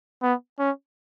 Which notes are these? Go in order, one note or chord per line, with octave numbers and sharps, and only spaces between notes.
B3
C#4